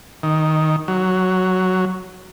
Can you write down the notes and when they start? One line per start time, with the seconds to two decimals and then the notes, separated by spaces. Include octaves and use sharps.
0.23 D#3
0.88 F#3